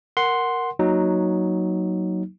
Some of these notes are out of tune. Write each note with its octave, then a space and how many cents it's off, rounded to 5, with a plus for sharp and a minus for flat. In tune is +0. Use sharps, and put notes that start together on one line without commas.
A#4 +0 F#5 +0 C6 +0
F#3 +0 A#3 +0 D#4 +0